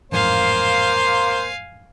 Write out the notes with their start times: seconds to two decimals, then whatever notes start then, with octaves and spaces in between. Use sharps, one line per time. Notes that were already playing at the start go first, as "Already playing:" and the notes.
0.12 A1 F2 G#2 A#3 C5 F5 G#5